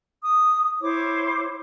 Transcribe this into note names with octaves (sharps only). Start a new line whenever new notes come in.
D#6
E4 C5 C#5 D6